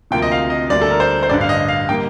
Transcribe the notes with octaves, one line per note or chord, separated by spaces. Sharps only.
D2 C3 F3 A#3 G5
D#5
F5
D#5
D2 D3 G3 A#3 D5
A4
A#4
C5
C5
A1 G2 D3 D5
F5
D#5
F5
D3 G3 A#3 G5